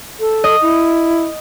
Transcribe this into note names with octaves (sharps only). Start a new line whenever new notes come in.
A4
D#5
E4